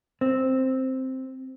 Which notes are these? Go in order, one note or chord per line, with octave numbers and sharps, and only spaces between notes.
C4